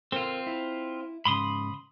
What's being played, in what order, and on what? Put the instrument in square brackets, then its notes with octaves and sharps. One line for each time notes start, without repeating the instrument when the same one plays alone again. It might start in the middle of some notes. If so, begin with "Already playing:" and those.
[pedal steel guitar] C4 F4 [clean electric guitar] A4 A#4 G5
[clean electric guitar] E4
[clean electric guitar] G#2 C#3 [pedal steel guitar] B5 C6 D#6